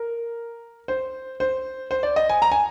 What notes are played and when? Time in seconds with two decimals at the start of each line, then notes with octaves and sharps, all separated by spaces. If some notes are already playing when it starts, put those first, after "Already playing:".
Already playing: A#4
0.88 C5
1.40 C5
1.91 C5
2.03 D5
2.16 D#5
2.29 G#5
2.42 A#5
2.52 G#5